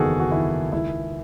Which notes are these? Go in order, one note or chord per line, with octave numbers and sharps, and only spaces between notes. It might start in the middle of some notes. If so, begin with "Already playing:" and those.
Already playing: F#1 E2 D#3 F#4 G#4 A4
F#4
D#3 E4
C#2 E4